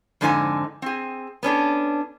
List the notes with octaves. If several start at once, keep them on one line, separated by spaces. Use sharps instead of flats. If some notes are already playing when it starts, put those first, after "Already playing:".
F2 G#2 D3 D#4 F4 G#5
C4 G#4
B3 C#4 D4 A4